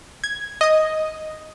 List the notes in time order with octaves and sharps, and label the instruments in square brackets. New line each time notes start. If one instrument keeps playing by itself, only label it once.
[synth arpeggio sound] G#6
D#5 D#6